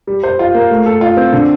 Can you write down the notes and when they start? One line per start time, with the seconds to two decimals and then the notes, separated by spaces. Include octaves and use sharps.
0.07 G3
0.24 C5
0.39 F4
0.54 A#3
0.71 A3
0.86 A4
1.01 F4
1.17 C4
1.33 D3